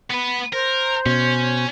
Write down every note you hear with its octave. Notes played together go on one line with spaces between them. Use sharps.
B3 B4
A#4 C5
B2 C#4